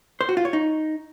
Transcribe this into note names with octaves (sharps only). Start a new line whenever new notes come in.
C5
F#4
F4
C#5
D#4